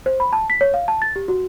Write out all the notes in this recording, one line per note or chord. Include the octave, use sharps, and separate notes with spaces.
C5
B5
A5
B6
C#5
F5
A5
A6
G4
F#4